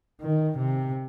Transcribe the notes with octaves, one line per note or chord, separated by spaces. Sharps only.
D#3
C3